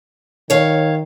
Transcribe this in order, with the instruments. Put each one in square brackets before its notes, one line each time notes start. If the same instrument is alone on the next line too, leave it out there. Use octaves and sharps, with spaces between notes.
[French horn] D#3 [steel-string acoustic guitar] C#5 F5